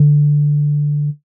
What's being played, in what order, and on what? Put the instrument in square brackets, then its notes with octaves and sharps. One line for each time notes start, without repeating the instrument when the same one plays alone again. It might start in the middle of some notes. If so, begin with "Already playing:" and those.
Already playing: [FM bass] D3